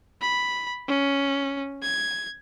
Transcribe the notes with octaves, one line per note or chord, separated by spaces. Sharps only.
B5
C#4
G#6